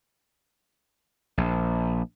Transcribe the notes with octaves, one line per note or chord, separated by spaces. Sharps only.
A#1